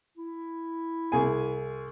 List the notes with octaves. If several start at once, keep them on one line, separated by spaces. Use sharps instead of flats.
E4
C2 G#4 G#5